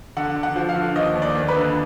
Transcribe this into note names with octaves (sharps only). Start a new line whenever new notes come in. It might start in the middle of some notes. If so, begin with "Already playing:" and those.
D3 F#5
D3
F#5
F3
F5
D3
D#2 D#5
D#2
D5
D#2
B4
D3